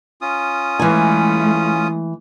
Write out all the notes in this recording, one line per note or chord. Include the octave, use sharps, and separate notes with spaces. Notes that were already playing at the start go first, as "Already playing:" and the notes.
C#4 F4 D#6
E3 G#3 A3 G#5